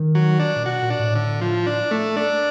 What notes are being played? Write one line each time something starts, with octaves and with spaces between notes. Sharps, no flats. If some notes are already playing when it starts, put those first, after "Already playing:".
Already playing: D#3
F#3
D4
A#2
B2 F#4
A#2
D4
A2
D3
F3
D4
A3
D4